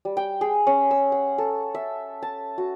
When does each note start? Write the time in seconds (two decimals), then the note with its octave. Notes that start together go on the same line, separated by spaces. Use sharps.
0.05 G3
0.17 G5
0.41 G#4
0.67 C#4
0.91 E6
1.12 F#5
1.38 A4
1.75 E5
2.23 A5
2.58 F#4